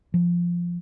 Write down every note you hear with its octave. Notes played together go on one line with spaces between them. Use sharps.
F3